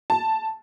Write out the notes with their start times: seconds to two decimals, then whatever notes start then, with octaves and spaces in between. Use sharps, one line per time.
0.10 A5